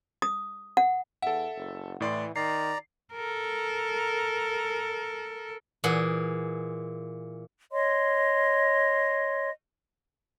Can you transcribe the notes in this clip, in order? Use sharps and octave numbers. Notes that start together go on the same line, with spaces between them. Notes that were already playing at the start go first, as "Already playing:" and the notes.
D#6
F#5
E2 A4 E5 F#5
F#1
A2 E3 D5 C6
D#3 D5 A#5 C7
A4 A#4
A#2 E3 G#4 F#5
C#5 D#5 C6